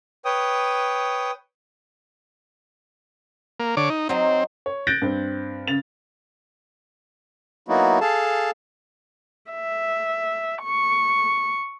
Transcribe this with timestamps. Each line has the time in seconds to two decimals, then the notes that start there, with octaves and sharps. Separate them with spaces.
0.25 B4 C#5 G5 D#6
3.60 A#3
3.77 D3 C#5 D6
3.90 D#4
4.09 F#3 C4 D#4
4.66 C#5
4.87 F#6 G6 A6 A#6 D7
5.02 G2 C4
5.67 C#3 A6 F7
7.68 F#3 A#3 B3 D#4 E4 F#4
8.01 G#4 A4 F5 A5
9.52 E5
10.63 C#6